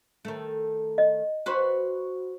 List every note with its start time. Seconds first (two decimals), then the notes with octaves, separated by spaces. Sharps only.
0.25 D#3 A3
0.98 D#5
1.46 F#4 B4 C5